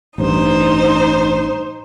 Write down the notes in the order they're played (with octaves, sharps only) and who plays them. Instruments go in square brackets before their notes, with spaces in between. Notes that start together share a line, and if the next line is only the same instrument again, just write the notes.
[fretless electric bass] A1 G2 [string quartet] D#4 C5